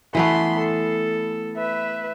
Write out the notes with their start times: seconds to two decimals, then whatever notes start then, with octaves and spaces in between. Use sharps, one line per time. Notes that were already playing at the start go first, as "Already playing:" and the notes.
0.15 E3 A3 B3 B5 C6
0.59 A4
1.56 B4 E5